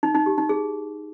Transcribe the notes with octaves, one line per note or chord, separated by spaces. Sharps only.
D#4
D#4
G4
D#4
G#4